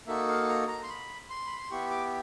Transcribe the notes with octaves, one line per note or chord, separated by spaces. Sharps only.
A#3 D#4 F#4 A4 E5
F5
A#5
A#5
C6
B5
C6
B5
C6
B3 E4 G4 C#6
D6